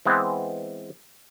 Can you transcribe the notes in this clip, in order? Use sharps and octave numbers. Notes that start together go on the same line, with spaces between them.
E3 G#3 B3 C4